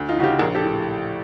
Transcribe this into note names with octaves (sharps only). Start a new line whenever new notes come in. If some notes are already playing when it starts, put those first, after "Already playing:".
Already playing: D2
D#4 F4
C#3 E3 F#4
F4 G4
A#1 G#4 A#4
G4 A4
A2